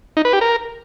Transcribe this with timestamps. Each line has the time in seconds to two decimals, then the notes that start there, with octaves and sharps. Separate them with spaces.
0.17 D#4
0.25 B4
0.33 G4
0.41 A#4